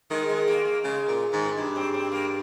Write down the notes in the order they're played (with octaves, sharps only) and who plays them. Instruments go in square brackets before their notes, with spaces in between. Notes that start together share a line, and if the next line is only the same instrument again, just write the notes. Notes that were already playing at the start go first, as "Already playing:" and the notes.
[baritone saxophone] D#3 [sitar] G#3
[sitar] G#3
A#3
A#3
[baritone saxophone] C#3 [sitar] G#3
[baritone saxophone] A#2
[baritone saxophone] G#2 [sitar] D#3
[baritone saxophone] G2 [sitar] G#3
[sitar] C4
C4
A#3